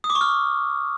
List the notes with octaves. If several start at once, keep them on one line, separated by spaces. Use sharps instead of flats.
D#6
D6
C#6
F6